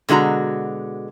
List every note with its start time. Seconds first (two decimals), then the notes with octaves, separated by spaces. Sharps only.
0.09 B2 D3 G#3 F#4 A#5